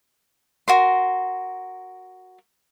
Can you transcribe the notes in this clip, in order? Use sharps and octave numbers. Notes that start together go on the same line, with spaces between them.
F#4 A#4 C6